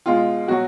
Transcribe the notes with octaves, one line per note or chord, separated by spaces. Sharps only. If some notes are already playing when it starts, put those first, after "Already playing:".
B2 G#3 F4
B2 F#3 F#4